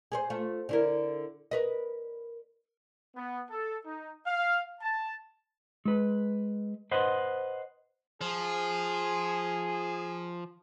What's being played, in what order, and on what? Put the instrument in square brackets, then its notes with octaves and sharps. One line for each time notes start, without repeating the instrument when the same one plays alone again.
[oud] G#4 A4 C5
A3 F4
D3 E4 A#4
A#4 B4 D#5
[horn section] B3
A4
D#4
F5
A5
[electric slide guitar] G#3 B4
B4 C5 D#5 F#5
[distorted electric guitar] F3 [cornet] G#4